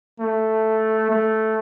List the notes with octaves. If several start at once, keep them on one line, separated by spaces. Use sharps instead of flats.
A3
A3